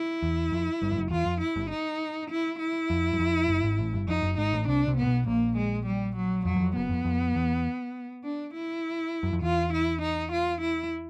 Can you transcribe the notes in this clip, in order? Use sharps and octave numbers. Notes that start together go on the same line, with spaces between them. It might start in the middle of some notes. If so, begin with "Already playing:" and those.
Already playing: E4
E2
F2
G1 G2
F2
F#1 F#2
E2 F4
F2
E4
G1 G2
D#4
E4
E4
F2
F#2
F2
F#1 F#2
G#1 G#2
A1 A2
G1 G2
F2 D#4
F#1 F#2
G#1 G#2 D#4
A1 A2
C2 C3 D4
C2 C3
A#2 B3
B1 B2
A#1 A#2 A#3
G#3
G3
F#3
F2 F#3
F#2
F2
F#1 F#2 B3
F2
F2
E2
D4
E4
F#2
F2
E2 F4
E4
D#4
F4
E4